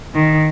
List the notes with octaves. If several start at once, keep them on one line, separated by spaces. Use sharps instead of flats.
D#3